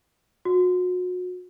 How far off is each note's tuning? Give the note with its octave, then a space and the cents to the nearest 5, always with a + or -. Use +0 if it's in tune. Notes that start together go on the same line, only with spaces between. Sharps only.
F#4 -35